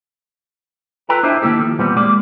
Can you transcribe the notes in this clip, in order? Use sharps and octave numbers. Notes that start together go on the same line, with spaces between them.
F4 A4 B4 G5 A#5
D4 E4 C5 D#5 E5
D#3 A#3 E4 G4 A4
F3
E2 A#2 G3 B3 C4
G#3 A#3 D5